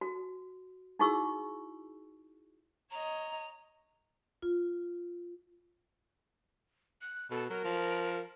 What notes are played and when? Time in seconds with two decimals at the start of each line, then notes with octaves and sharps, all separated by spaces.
0.01 F#4
0.99 D#4 E4 F#4 G#4 C#6 E6
2.91 C#5 D#5 A#5
4.42 F4
7.02 F#6
7.31 B2 A4
7.50 F#3 A#4
7.65 F3